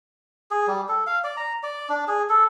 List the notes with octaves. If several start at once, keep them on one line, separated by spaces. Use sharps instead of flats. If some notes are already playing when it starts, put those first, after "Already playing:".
G#4
G3
A4
F5
D5
A#5
D5
D4
G#4
A4